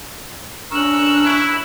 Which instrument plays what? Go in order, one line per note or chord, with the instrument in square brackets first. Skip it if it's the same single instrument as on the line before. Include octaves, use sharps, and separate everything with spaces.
[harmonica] C#4 A#4 C#6 [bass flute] D4 [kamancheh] E6 F#6
[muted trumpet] E4